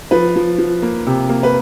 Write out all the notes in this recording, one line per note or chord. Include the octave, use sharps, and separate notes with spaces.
F3 B4
F3
F3
A#3
C3
A#3
B4